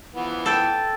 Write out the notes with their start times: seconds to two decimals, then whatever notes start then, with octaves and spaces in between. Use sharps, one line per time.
0.15 E3 F3 B3
0.46 A4 G5